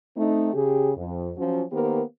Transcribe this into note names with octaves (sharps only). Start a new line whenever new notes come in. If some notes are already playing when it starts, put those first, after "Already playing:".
A3 C4 D#4
C#3 G4 G#4
F2
F3 F#3 C#4
D#3 A#3 B3 G4 A#4 C5